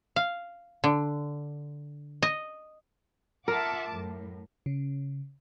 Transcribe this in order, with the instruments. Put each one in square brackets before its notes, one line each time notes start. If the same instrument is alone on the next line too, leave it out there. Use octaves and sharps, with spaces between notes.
[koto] F5
D3
D#5
[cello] F4 E5 [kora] A#4 [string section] F#5 A5 D6
[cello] F#2 [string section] A2
[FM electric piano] C#3